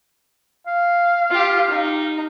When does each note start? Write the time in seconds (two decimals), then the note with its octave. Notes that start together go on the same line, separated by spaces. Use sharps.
0.67 F5
1.31 F4 G4
1.70 D#4